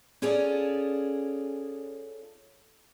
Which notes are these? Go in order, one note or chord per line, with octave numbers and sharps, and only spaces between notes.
C#4 F4 G#4 A4 C#5 D5